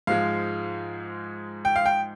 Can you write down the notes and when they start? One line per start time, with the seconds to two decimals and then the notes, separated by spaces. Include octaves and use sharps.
0.07 G#2 F3 G#3 F5
1.65 G5
1.76 F5
1.86 G5